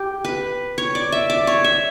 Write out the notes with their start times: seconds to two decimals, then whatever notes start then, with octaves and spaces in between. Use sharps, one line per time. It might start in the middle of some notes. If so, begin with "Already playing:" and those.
Already playing: G4
0.24 B4
0.78 C#5
0.95 D5
1.12 E5
1.30 D5
1.47 C#5
1.64 E5